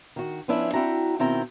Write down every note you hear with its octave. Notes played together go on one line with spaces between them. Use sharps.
D#3 F#4
F3 B3 C#4 D4 E4
C4 E4 F#4 G5 A#5
B2 D#3 C4 E4 G5 A#5